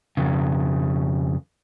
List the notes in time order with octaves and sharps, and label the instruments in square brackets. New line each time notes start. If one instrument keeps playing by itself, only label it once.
[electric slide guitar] F2 C#3